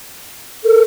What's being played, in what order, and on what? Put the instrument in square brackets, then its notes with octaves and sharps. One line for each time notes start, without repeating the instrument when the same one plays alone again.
[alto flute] A4 [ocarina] A#4